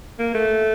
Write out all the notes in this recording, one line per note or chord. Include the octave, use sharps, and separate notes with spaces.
A#3
A3